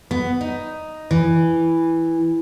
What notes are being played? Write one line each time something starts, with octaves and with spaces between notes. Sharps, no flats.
B3
D#4
E3